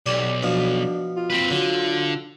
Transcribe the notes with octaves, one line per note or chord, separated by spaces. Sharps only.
B1 G4 D5
B2 F3 D4
F4
C4 B4
D3 F#3